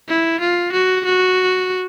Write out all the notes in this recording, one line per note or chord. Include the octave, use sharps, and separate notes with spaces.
E4
F4
F#4
F#4